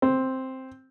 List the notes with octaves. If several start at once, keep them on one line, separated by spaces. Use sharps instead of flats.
C4